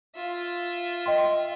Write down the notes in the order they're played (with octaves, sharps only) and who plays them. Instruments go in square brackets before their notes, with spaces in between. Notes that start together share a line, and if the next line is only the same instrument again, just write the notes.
[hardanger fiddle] F4 E5
[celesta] D#5 G5 C6